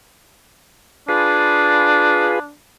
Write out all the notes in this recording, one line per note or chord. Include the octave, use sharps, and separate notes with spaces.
D4 F4 G#4 B4